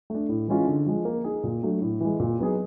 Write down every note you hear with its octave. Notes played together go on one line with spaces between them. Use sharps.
A3 D4
A2
E3 G#3 C#4 F4
D3
F3 G#3
A#3
D#4 G#4
A#2
F#3 A3 D4
A2
E3 G#3
A#2
F#3 B3 D#4 G#4